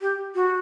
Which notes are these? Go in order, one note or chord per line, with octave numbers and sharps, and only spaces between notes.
G4
F#4